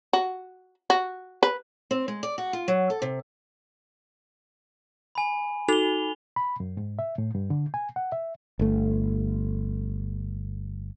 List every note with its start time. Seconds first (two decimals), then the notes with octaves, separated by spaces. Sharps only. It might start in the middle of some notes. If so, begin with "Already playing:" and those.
0.13 F#4
0.90 F#4
1.43 B4
1.91 C4
2.08 G#3
2.23 D5
2.38 F#4
2.53 F4
2.68 F#3
2.90 A4
3.02 C3
5.15 G#5 B5
5.68 D#4 F#4 A4 F7 G7
6.36 B5
6.60 F#2
6.77 G#2
6.99 E5
7.18 A2
7.35 G2
7.50 D3
7.74 G#5
7.96 F#5
8.12 E5
8.59 G1 A3